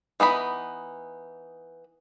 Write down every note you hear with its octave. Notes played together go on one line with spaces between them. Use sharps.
E3 B3 D#4 B5